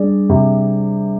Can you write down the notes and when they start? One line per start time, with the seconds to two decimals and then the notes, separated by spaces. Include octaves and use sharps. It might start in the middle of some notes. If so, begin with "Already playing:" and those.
Already playing: G3 D4 G#4 D5
0.30 C3